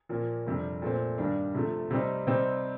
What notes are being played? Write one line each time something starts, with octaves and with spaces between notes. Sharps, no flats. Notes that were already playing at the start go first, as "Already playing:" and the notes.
A#2 F3 A#3
F2 C3 G3 D4
A#2 A3 C4
G2 D#3 G3 D4
C3 F3 A3
C3 G3 C4 D#4
C3 G3 C4 D#4